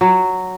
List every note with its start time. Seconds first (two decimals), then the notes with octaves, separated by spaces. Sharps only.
0.01 F#3